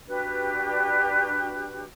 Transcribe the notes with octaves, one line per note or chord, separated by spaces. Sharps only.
D4 F#4 G4 B4